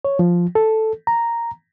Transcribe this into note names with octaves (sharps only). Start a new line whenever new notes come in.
C#5
F3
A4
A#5